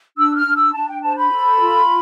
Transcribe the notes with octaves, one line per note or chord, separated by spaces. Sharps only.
D4 E6
F6
D4
E6
D4 A5
G5
C5 A5
B5
A4
F4